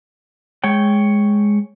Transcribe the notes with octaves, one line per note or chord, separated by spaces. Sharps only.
G#3 C#5 G5